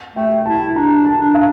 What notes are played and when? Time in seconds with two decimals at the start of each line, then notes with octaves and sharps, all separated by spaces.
0.16 A3 G5
0.46 E4 A5
0.75 D4 A#5
1.05 A5
1.20 D4
1.34 F5